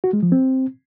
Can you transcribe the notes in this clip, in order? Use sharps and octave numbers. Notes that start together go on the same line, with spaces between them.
F#4
G#3
F3
C4